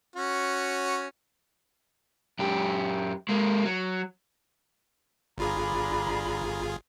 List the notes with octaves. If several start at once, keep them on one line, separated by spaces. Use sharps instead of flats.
C#4 F#4
F#2 G4
G#3 A#3
F#3
G1 D4 F4 G#4 A#5 B5